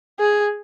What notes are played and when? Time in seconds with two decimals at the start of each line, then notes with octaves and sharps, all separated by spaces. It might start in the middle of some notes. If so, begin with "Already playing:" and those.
0.20 G#4